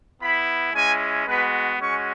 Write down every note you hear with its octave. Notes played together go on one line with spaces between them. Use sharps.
B3 E4 B5
G#3 C#4 E4 G#5
G#3 B3 F#4 B4
G#3 C#4 F#4 C#6